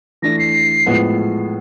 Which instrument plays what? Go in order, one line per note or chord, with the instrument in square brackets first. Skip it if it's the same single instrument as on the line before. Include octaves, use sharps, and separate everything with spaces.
[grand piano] E3 A3 D4 [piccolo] A#6
[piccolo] C7
[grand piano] A2 F3 G#3 B3